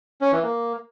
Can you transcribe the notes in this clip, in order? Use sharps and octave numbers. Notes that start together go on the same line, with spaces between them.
C#4
E3
A#3